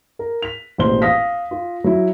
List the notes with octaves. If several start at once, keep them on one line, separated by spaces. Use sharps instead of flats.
A#4
B6 F7
E1 A1 A#2 C5 C6 G7
F5 D#6 A#6 B6
F4
F#3 E4